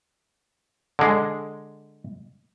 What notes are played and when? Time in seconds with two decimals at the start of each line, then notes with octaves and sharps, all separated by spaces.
0.99 D3 G#3